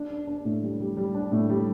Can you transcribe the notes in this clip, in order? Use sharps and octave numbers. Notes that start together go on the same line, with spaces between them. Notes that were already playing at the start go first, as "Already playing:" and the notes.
Already playing: D4
D4
D4
A2
G3
G3
G3
D4
A2
G3